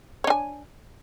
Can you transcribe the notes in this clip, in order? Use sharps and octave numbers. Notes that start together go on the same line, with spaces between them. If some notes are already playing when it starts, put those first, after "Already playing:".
D4 C#5 G#5